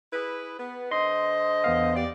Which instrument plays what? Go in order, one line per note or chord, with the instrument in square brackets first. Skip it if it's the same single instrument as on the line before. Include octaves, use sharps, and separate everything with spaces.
[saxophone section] E4 G#4 B4
B3
[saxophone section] D3 C5 D#5 [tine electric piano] C6
[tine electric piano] E2 B3 F5
[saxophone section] G4 D5